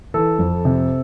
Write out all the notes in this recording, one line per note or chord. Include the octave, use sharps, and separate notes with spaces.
E3 A4
F2
C3